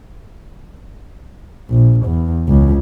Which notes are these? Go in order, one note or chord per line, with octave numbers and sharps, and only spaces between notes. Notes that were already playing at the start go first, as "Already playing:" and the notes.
A#1
E2
C#2